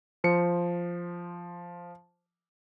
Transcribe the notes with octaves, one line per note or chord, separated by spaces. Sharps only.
F3 C5 C#7